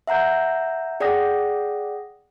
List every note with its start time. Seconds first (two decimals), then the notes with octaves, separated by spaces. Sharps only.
0.07 E5 F#5 A#5 G6
1.00 G#4 D5 F#5 G5 D#6 A#6